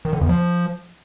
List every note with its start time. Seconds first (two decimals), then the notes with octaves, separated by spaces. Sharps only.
0.05 D#3
0.13 D3
0.21 E2
0.29 F3